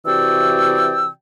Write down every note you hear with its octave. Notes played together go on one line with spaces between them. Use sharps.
C3 E3 F#4 D5 G5 E6